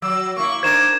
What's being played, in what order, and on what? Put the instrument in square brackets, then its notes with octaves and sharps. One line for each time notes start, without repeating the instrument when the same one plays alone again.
[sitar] F#3 [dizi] E6
[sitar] A#3 E4 [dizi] C#6
[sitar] D4 D#4 C5 [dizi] A#4 [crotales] G#6 E7